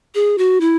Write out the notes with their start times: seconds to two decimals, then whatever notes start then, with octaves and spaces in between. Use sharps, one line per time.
0.15 G#4
0.38 F#4
0.61 E4